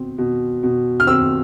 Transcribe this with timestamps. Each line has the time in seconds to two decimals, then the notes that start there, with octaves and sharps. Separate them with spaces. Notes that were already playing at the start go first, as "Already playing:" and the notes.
Already playing: B2 C4
0.18 B2
0.63 B2
1.00 F6
1.07 C4 E6